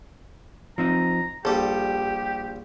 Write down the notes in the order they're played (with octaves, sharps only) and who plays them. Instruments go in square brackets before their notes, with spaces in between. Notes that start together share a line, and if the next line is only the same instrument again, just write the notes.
[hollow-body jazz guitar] F3 C4 D#4 [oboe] A#5
[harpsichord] A#1 G3 [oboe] G4 [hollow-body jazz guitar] A4